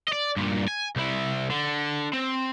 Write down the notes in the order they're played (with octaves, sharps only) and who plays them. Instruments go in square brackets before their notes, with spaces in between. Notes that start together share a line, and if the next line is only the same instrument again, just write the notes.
[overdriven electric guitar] D5 D#5
G2 A#2
G#5
C2 E4
D3
C4